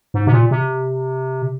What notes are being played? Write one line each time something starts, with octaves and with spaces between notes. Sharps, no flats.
G#2
C3
A#2
C3